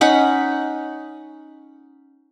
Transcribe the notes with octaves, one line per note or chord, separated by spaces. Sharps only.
C#4 D#4 F#5 B5